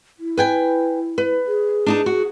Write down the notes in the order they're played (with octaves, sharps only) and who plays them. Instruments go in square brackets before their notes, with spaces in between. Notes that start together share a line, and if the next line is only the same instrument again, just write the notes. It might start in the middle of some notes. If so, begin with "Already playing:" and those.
[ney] E4
[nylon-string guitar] B4 G5 G#5
B4
[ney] G#4
[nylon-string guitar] D4 D#4 A5
F#4